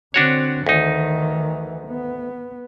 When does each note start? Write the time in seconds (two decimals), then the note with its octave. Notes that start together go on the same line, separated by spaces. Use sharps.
0.14 D3 C4 D4 F#4 C#5
0.67 D2 D#3 E3 D#4
1.87 B3